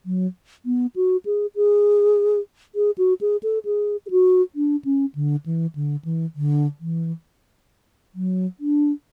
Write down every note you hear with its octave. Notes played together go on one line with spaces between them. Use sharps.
F#3
B3
F#4
G#4
G#4
G#4
F#4
G#4
A4
G#4
G#4
F#4
D4
C#4
D3
E3
D3
E3
D3
E3
F#3
D4